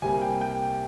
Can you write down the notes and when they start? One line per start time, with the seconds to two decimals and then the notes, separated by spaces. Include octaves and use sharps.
0.02 C2 C3 G3 A#3 G#5
0.22 G5
0.41 G5